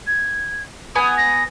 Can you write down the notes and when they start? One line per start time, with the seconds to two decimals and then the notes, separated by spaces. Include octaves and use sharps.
0.07 G#6
0.95 B3 G#5 D#6
1.18 A#6